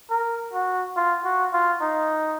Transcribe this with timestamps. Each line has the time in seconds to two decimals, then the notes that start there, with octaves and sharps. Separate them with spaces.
0.10 A#4
0.54 F#4
0.97 F4
1.25 F#4
1.53 F4
1.81 D#4